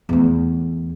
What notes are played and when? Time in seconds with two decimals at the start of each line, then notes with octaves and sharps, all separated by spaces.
0.09 E2 A3